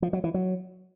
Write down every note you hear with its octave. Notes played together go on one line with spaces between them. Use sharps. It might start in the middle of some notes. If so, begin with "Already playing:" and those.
F3
F#3
E3
F#3